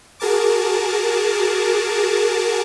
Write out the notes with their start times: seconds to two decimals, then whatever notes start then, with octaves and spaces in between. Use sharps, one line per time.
0.20 F#4 G#4 A#4 A5 D6